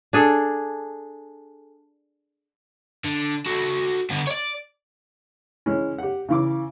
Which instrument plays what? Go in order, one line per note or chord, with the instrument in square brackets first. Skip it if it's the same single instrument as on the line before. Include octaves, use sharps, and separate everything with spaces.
[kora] D4 G#4 A4
[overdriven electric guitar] D3
F#4 A4
D3 B3
C#5 D5
[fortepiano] E3 G#3 C#4
G4 F#5
C#3 E3 D6